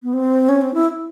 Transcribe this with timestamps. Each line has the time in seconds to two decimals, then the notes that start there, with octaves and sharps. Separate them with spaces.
0.03 B3
0.13 C4
0.49 C#4
0.62 C4
0.74 E4